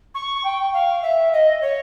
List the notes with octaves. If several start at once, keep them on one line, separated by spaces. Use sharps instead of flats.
C#6
G5
F5
E5
D#5
C#5